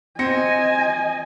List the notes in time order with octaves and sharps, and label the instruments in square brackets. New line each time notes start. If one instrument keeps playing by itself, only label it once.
[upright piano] C4 A#6 C#7 [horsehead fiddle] D#5 G#5